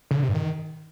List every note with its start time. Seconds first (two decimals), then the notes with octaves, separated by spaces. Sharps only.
0.11 C#3
0.17 D3
0.23 C3
0.29 G2
0.35 D#3